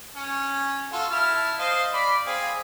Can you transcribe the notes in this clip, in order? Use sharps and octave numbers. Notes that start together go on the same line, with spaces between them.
C#4
F4 F#4 A4
E4 A5 F6
C5 D#5 F5
D5 B5
C4 G#4 F5